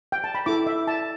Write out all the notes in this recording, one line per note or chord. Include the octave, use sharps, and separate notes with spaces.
G5
A5
B5
E4 A4 D6
E5
A5